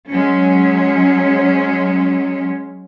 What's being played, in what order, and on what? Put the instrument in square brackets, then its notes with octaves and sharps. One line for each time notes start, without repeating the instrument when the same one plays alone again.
[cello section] F#3 G#3 C#4